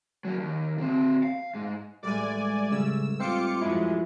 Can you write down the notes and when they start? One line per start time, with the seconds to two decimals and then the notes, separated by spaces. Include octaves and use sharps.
0.25 F#3 A#3
0.40 D#2
0.78 D3 C4
1.23 F5
1.54 G#2
2.03 A1 G3 G#3 D5 G#5
2.72 C#3 G3 C#4 E6
3.20 C4 D#4 F4 C5 F5 D6 C#7
3.61 F#2 F3 G#3 E4